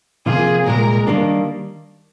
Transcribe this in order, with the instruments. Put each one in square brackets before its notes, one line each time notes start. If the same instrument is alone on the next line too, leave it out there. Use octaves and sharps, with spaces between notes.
[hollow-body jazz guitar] C3 F3 A#3 F4 [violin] G#4
[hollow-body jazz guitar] C2 A#2 G#3 [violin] A#4
[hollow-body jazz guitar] D#3 G3 A#3 D4